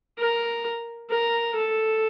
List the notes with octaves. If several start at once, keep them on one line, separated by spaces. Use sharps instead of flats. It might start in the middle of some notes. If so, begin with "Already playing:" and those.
A#4
A#4
A4